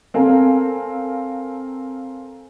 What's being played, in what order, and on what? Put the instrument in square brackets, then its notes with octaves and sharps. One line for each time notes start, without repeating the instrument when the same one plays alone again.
[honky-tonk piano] C4 A4 A#4 F5 G#5